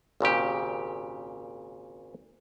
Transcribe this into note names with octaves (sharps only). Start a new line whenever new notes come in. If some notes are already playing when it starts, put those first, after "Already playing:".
G#1 A#2 C#3 G4